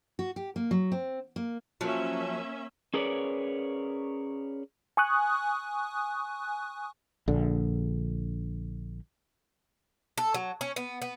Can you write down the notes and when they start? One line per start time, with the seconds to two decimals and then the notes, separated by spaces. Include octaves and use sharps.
0.19 F#4
0.36 G4
0.56 A#3
0.71 F#3
0.92 C4
1.36 A#3
1.81 F3 F#3 A#3 C#4 E5
2.94 C#4 G#4 A#4 B4 C#5 D5
4.97 G#5 C#6 D#6 F#6
7.28 A#1 D3
10.18 A4
10.34 F#3
10.61 C#4
10.76 B3
11.02 B3